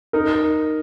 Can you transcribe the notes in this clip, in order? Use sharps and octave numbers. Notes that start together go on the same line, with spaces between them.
D#4 A#4